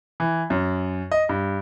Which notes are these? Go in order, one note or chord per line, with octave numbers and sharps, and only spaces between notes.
E3
F#2
D#5
G2